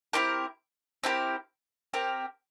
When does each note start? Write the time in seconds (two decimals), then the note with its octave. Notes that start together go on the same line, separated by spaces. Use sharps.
0.13 C4 E4 G4 A#4
1.04 C4 E4 G4 A#4
1.93 C4 G4 A#4